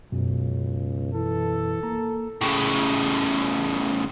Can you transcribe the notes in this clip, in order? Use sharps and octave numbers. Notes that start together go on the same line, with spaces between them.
C#2 F#2 B2
E3 A4
A#3 A#5
A2 C#3